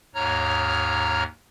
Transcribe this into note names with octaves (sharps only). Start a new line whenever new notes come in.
D#2 G#2 C#5 A#5 F6